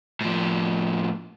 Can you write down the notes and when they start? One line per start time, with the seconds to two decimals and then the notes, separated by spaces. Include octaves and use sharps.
0.21 A2 F3